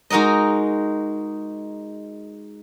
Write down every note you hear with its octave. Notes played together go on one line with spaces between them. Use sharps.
G#3 D#4 F#4 A#4 D#5